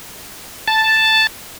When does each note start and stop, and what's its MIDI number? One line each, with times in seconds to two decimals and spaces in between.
0.68 1.27 81